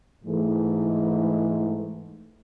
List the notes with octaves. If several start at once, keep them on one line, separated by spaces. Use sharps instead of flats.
G#2 E3 G#3 A3